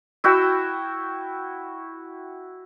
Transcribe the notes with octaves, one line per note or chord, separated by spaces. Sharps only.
E4 F#4 G5 E6